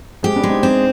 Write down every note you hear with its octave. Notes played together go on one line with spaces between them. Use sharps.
G#3 C4 G4
B3 D4
G#3
C4 D#4
C4 D#4